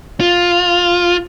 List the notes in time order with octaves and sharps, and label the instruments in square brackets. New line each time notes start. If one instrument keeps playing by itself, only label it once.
[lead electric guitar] F4